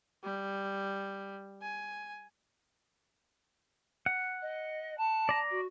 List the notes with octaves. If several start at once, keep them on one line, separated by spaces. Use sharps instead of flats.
G3
G#5
F#5
D#5
A5
D5 A#5
F#4